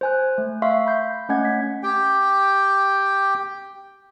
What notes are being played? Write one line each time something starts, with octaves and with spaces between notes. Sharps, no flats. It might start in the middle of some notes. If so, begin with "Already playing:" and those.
C5 G#5 F#6
A3
E5 F5 C6 C#6
B5 G6
A3 C#4 D#5 F#5 G#5 G#6
B6
G4 G5